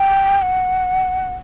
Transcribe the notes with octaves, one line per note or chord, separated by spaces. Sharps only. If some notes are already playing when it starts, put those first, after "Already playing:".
Already playing: G5
F#5